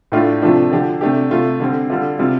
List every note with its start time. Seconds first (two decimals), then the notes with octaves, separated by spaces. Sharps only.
0.12 A2 A3 D4 F4
0.42 C3 F3 A3 D4 F4
0.71 D3 F3 D4 G4
1.01 C3 A3 D4 G4
1.31 C3 A3 F4
1.60 D3 G3 C4
1.90 D3 G3 D4 F4
2.19 C3 G3 F4